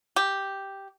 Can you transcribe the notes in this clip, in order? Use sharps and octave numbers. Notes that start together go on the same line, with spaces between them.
G4